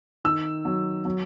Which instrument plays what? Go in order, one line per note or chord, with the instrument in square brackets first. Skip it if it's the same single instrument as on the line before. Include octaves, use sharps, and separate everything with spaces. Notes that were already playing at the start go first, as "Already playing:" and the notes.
[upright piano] D#3 E6
F#3
F#3